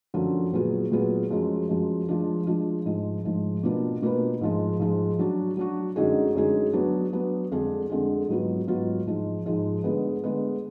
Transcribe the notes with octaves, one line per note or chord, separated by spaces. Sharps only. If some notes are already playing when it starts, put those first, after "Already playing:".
F#2 D3 F3
A#2 F#3 B3 F4 G#4
A#2 F#3 B3 F4 G#4
F#2 F3 G#3
F#2 F3 G#3
F3 G#3 D4 F4
F3 G#3 D4 F4
G#2 F3 G#3
G#2 F3 G#3
B2 A#3 D4 F4 B4
B2 A#3 D4 F4 B4
G#2 F3 G#3
G#2 F3 G#3
F#3 D4 F#4
F#3 D4 F#4
F#2 D3 G#3 D#4 G#4
F#2 D3 G#3 D#4 G#4
F#3 B3 D4
F#3 B3 D4
F2 D3 G#3 D4 G#4
F2 D3 G#3 D4 G#4
G#2 F#3 B3 F4
G#2 F#3 B3 F4
G#2 F3 G#3 D#4
G#2 F3 G#3 D#4
D3 G#3 B3
D3 G#3 B3